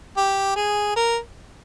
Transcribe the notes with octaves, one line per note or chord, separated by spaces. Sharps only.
G4
G#4
A#4